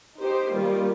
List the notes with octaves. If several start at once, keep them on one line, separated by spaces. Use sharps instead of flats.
D#4 G4 C5
D#3 G3 A#3 F4